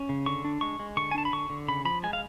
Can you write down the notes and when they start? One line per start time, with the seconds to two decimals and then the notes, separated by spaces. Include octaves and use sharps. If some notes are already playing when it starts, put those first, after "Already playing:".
Already playing: C#4
0.09 C#3
0.26 D3 C#6
0.45 D4
0.61 G#3 C#6
0.80 G#3
0.97 D3 C#6
1.11 G#5
1.15 D4 A5
1.25 B5
1.33 D3 C#6
1.50 D3
1.68 C#3 B5
1.85 F3 B5
2.03 G#3 G#5
2.13 F5